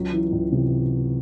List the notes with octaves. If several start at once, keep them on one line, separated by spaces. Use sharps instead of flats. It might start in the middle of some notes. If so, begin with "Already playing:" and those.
Already playing: C#2 F#3
E3
C#2
C3